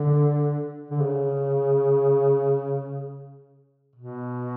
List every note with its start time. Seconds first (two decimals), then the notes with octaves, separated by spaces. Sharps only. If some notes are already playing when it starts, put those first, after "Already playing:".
Already playing: D3
0.91 D3
1.01 C#3
3.95 B2